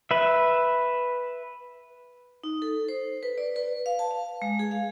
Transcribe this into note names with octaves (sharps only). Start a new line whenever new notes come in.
B4 E5
D#4
A4
C5
B4
D5
B4
F5
A5
F5
G#3
G#4
F5